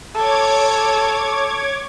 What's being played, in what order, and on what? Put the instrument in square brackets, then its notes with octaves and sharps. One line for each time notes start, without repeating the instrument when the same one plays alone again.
[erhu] A4 [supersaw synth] C#5 D6 G#6